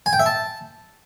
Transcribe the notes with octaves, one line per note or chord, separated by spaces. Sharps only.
G#5
G5
E5
A5